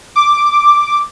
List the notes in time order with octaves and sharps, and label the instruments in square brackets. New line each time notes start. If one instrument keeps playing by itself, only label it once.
[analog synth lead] D6